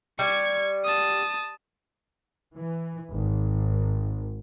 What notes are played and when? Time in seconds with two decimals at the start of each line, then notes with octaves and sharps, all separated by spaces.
0.19 G3 C#6 G#6
0.84 A5 D#6
2.56 E3
3.13 G#1